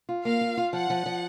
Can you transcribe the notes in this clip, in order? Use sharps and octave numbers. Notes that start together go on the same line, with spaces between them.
F4
A#3 F5
F4
F4
F3 F#5
F3
F3